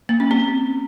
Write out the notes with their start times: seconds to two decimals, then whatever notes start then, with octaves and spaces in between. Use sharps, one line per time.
0.09 A#3
0.20 C#4
0.31 C4